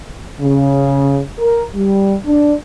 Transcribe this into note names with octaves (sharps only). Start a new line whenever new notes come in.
C#3
A#4
G3
D4